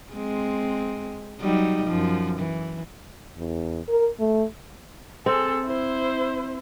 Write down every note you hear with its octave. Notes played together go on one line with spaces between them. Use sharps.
G#3 C4
F#3 G3 D#4
F#2 F3
E3
E2
A#4
A3
C4 G#4 A4
E4 C5